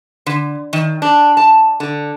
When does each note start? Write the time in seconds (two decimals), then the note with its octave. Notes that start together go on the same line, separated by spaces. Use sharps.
0.26 D3
0.73 D#3
1.02 D4
1.37 A5
1.80 D3